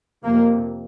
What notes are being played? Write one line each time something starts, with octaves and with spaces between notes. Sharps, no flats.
F2 C3 A#3